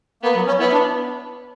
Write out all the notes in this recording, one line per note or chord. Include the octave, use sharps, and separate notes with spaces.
A#3 B3
F#3
C#4
B3 E4
D4